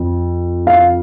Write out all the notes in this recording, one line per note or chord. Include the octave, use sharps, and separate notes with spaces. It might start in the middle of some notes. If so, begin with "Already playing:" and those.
Already playing: F2
F5